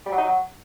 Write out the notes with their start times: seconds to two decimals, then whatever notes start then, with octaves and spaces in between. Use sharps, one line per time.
0.06 G3
0.12 F#3
0.18 D#4
0.24 F#3